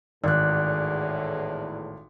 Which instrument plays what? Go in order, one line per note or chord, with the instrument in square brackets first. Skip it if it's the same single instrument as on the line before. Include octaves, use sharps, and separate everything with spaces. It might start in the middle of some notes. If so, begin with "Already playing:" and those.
[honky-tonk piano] G#1 [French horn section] E2 A2 [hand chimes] D5 F#6